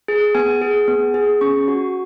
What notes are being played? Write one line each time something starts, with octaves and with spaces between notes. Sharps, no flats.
G#4
B3 G#5
G#4
B3
G#4
C#4 C#6
F#4